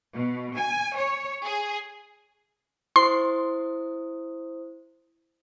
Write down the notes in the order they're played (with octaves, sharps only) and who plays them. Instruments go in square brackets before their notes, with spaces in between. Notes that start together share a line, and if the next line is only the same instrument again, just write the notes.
[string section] B2
G#5
C#5
G#4
[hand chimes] E4 C5 D#6 [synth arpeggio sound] C6